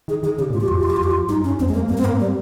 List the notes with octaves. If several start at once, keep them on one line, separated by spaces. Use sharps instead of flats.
D#3 G#4
D#3 G#4
C#3 G4
A#2
G#2 F4
G4
F2 F4
G4
F4
G4
F2 F4
G4
F4
G2 D#4
C#4
F2 C4
G#3
A#3
G2 A#3
C4
G#2 A#3
G3